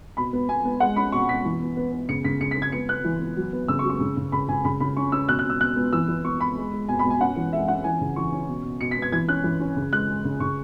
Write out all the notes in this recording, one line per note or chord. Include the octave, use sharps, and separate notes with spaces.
B2 B5
B3
B3 G#5
B3
G#3 F#5
C#4 B5
B2 C#6
B2 B6
E3
B3
B3
B3
C#3 C#7
C#3 B6
C#3 C#7
B6
C#3
G#6
B3 C#7
B3 F#6
E3
B3
F#3
B3
C#3 E6
C#6
F#3
C#6
C#3
C#3
C#3 B5
C#3 G#5
C#3 B5
C#3 B5
C#4 C#6
C#4 E6
B2 F#6
F#6
B2
E6
B2 F#6
B3
E3 E6
E3
B3 C#6
B3 B5
G#3
G#3
B2 G#5
B5
B2
G#5
C#4 F#5
E3
G#3 E5
C#4 F#5
E3 G#5
C#3
E3 C#6
C#4
B2
B2
B2 C#7
B6
B3
G#6
E3 G#6
C#4 F#6
E3
C#4
C#3
G#3 F#6
G#3
C#3
C#3 C#6